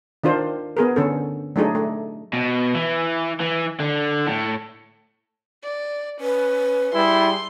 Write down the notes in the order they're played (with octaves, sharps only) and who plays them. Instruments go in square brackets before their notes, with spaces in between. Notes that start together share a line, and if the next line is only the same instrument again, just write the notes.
[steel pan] D#3 D4 F4 C5
B3 G#4 A#4
D3 C#4 A4
F#3 A3 D4 D#4 G#4
A3
[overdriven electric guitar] B2
E3
E3
D3
A2
[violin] D5
[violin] C#4 [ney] B4
[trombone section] G3 G#4 [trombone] E4 [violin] C6